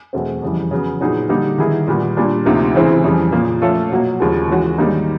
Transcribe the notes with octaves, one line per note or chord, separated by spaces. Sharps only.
E2 B2 F#3 A3 C4
F2 C#3 E3 G3
C#3 F#3 B3
A#2 F#3 B3 D#4 G#4
D3 G3 A#3 D#4 G4
D#3 G3 B3 E4 G#4
A#2 G3 B3
A#2 G3 A#3 D4
D2 C3 F3 A#3 D#4
C#3 E3 G#3 C4 E4
F2 C#3 E3 G3
A#2 F3 A#3
F3 A3 C#4 F4 A4
B2 F#3 A#3
D#2 C#3 F3 G#3
E3 G#3 C#4 F#4
G#2 D#3 G3 A#3 D#4